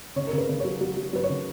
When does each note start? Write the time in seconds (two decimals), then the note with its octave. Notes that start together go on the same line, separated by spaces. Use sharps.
0.16 C#3 C#5
0.27 A#4
0.33 C#3
0.38 B4
0.49 C#3
0.60 F#3 C#5
0.81 F#3
0.97 F#3
1.13 F#3 B4
1.24 C#5
1.30 C#3